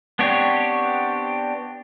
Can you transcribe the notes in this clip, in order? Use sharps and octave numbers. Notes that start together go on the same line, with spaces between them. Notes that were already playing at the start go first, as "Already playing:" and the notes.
B3 C4 D4 G4 C#5